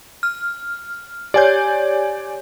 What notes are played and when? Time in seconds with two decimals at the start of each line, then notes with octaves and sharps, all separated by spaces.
0.23 F6
1.34 G4 C#5 D5 G#5 G6